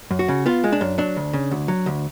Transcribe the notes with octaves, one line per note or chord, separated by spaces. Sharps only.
F#2
F#4
C#3
B3 F4
G#3
D4
F#2
F#3 D4
D2
C#3
D2
F#3
D2